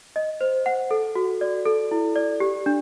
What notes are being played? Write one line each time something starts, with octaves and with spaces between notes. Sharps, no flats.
D#5
C5
F#5
A4
F#4
D5
A4
E4
D5
G4
D4